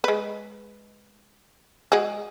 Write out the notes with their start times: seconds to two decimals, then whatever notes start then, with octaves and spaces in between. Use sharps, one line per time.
0.04 G#3 B4
1.92 G#3 F#4 G#4